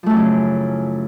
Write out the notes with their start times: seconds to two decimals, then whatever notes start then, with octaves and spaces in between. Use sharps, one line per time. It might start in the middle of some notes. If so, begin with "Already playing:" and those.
0.03 F3
0.06 A3
0.10 F#2
0.13 E3
0.16 C#3